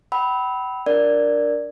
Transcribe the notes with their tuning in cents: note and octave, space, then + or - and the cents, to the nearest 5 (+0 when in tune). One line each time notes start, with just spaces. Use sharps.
G5 -45 B5 +0 E6 -30
D4 +0 A#4 +0 D5 +0